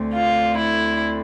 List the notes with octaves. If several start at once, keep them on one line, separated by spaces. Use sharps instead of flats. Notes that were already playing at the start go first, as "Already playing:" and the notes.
Already playing: D2 D3 A3 C4
F4
E4